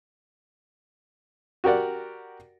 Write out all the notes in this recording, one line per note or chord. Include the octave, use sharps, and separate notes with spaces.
F#4 G4 A#4 D5 F#5